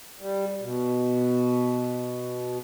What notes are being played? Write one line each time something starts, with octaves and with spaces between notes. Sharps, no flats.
G3
B2